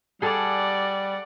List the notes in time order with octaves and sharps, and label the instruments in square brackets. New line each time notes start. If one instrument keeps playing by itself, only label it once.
[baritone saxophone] G3 [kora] G#4 A4 [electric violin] D5 F#5